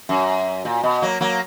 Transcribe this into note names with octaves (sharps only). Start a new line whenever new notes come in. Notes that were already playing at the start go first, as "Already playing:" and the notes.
F#2
A#2
B2
F#3 A#3
F#3 A#3